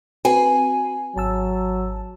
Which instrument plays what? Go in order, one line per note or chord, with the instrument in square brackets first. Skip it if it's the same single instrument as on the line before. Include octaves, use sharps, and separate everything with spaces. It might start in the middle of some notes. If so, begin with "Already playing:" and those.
[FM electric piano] C4 F#4 B4 [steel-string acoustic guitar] G#5
[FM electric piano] G#1 A5 E6 [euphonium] F#3